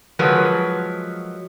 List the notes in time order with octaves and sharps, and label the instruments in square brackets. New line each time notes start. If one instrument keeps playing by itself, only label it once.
[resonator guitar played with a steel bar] F3 F#3 G#3 G#4 A#4 B4